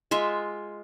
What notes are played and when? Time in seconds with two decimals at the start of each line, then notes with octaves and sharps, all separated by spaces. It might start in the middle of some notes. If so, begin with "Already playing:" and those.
0.11 G#3 F4 E5